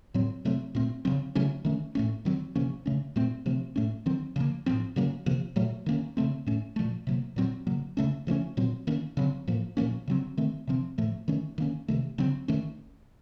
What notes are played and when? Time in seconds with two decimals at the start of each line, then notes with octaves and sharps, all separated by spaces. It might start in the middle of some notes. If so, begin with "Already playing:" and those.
0.14 A2 F#3 C4
0.45 C3 F#3 A3 C4
0.75 A#2 A3 C4
1.05 C#3 F#3 C4
1.35 C#3 F#3 A3 C#4
1.65 D#3 A3 C#4
1.95 A2 A3 C#4
2.25 D#3 F#3 C4
2.55 C3 F3 A#3 C#4
2.86 C#3 A3 C#4
3.16 A#2 A3 C4
3.46 C3 F3 A3 C4
3.76 A2 A3 C#4
4.06 D#3 F#3 C4
4.36 C#3 F3 A#3
4.66 A2 F3 C4
4.96 C#3 F#3 A#3 C#4
5.26 C3 F3 A#3
5.56 A#2 F#3 A3
5.86 D#3 A#3 C#4
6.17 C#3 A3 C4
6.46 A2 A3 C#4
6.76 A#2 F3 A3
7.07 C3 F#3 A#3
7.36 A#2 F#3 C4
7.67 C#3 F#3 A#3
7.97 C#3 A3 C#4
8.27 C#3 F3 A3 C#4
8.57 A#2 F#3 C4
8.87 D#3 A#3 C#4
9.17 C#3 F#3 C4
9.48 A2 F3 A#3
9.77 A#2 F3 A#3 C#4
10.08 C#3 F#3 C4
10.37 D#3 A3 C4
10.67 C3 F3 C4
10.98 A2 F3 A3
11.28 D#3 A3 C#4
11.58 D#3 A#3 C#4
11.88 C3 D#3 A3
12.18 C#3 F#3 C4
12.48 D#3 A3 C#4